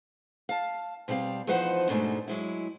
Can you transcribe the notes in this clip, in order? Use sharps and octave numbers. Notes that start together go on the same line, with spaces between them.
F5 A5
B2 G3 C4 C5 F5
E2 F3 D#4 B4 C5 F#5
G#2 B2 G#3 A3 D4 D#4
F#3 G#3 E4